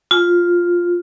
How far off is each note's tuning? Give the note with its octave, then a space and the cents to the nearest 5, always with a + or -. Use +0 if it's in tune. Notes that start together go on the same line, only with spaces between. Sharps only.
F4 +5